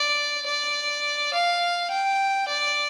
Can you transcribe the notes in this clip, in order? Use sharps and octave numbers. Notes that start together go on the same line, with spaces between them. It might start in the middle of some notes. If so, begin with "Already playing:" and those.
Already playing: D5
D5
F5
G5
D5